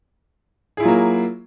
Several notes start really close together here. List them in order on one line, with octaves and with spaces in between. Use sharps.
G#4 E4 F4 F#3 A#3